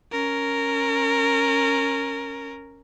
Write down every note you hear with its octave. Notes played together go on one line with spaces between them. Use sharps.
C#4 A#4